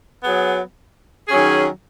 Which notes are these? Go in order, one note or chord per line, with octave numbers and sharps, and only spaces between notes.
F#3 B3 G#4
D#3 F#3 C#4 G#4